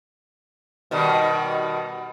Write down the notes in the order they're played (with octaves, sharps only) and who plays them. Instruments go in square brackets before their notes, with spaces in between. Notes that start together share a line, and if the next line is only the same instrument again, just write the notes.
[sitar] B2 D#3 G3